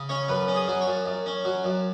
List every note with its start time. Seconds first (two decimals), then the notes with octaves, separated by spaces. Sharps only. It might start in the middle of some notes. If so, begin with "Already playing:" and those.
Already playing: C#3
0.09 C#4 C#5
0.28 F#2 B4
0.48 C#4
0.54 G#4
0.68 F#3
0.81 C#5
0.86 F#2
1.06 F#2
1.26 C#4
1.45 F#3
1.64 F#2